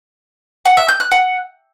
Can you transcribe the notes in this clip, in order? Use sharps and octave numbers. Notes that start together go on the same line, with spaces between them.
F#5
E5
G6
F#6
F#5